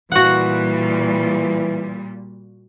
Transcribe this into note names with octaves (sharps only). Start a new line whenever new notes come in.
A#2 E3 G3 F#4 F#5